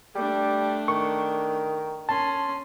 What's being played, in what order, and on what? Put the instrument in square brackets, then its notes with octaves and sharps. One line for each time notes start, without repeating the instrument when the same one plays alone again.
[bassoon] G3 [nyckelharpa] A3 D4
[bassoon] D#3 [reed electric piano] C#6
[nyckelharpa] C#4 C6 [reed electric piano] A5